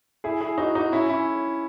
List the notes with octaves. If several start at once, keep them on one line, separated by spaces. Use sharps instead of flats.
E4 G#4
E4 G#4
D#4 F#4
D#4 F#4
C#4 E4
C#4 E4